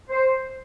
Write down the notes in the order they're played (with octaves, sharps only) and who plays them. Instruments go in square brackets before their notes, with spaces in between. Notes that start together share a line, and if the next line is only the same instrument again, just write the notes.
[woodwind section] C5